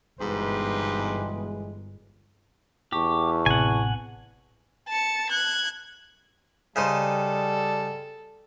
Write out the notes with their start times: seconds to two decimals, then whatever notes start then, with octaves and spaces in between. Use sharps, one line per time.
0.20 G1 G#2 B2 E3 G#3 G4 B4 C6
2.93 E2 G4 A5 C#6
3.46 A1 C3 F#5 G#5
4.89 A5 C#7
5.30 F#6 G#6
6.76 C#3 G3 D#4 A4 C5